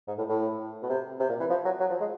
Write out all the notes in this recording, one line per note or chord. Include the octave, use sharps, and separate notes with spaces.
G#2
A2
A2
B2
C3
C3
A#2
E3
F3
F#3
F#3
F3
G#3